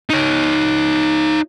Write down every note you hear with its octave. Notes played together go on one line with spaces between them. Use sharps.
D#4 C#5